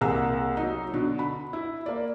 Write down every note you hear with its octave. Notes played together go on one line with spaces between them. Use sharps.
C2 A#3 G#4 A#5 E6
F#3 D#4
B2 D3
B5
E4
A#3 D5